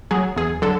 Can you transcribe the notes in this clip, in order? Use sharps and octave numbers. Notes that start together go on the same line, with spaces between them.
F#3 G#4
E2 G#4
D3 F#3 A4